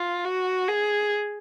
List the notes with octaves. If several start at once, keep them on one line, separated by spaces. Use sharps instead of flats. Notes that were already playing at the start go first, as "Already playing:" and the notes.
Already playing: F4
F#4
G#4